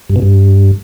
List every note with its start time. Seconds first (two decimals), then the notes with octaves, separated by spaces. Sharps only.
0.10 G2
0.16 B2
0.22 G2